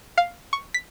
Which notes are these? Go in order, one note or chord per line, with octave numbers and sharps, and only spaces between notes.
F5
C#6
B6